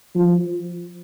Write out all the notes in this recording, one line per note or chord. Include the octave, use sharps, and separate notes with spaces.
F3